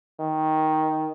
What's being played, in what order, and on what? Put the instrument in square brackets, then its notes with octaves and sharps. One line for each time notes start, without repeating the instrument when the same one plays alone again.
[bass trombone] D#3